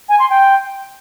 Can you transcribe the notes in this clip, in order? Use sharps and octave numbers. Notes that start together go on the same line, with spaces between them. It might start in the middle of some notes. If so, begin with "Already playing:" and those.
G#5
C6
G5